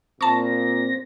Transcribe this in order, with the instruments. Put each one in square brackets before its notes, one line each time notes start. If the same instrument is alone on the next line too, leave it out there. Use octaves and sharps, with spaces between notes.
[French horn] A#2 [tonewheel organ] C4 A#6 [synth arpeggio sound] A5 C#6